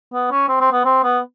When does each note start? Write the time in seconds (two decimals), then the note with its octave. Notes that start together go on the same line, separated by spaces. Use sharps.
0.13 B3
0.31 C#4
0.48 C4
0.61 C4
0.72 B3
0.85 C4
1.03 B3